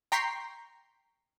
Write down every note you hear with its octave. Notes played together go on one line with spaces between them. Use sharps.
G5 A#5 C6 C#6 B6 C7